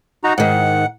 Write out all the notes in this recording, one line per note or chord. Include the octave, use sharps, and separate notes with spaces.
D#4 F#4 A#5
G#2 D#3 F#5